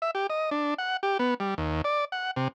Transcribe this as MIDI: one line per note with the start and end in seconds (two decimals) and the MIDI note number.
0.02 0.11 76
0.15 0.27 67
0.30 0.50 75
0.51 0.74 62
0.78 0.97 78
1.03 1.18 67
1.19 1.34 59
1.40 1.54 55
1.58 1.82 39
1.84 2.05 74
2.12 2.31 78
2.36 2.48 48